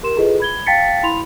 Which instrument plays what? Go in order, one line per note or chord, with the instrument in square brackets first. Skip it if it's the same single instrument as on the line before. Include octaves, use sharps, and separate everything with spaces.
[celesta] G4 A#4 C6 E7
E4 F4 G#4 A4 B4 D#5
B5 G#6 G7
F5 G5 A5 A6 B6 C#7
E4 B5 C6 F7